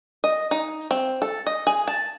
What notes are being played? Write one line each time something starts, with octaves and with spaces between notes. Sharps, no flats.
D#5
D#4
C4
A4
D#5
G#4
A5